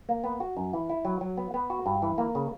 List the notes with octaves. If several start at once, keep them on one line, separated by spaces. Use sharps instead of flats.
A#3
B3
F#4
F#2
E3
E4
F#3
F#3
B3
B3
F#4
G2
E3
A#3
C#3